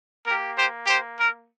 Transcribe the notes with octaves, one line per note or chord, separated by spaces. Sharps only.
A#3 G4 A#4
G4 C5
G4 C5
A#4